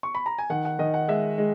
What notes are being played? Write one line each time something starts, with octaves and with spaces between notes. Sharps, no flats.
C#6
B5
A#5
G#5
D#3 F#5
F#5
D#3 D#5
F#5
G#3 E5
G#3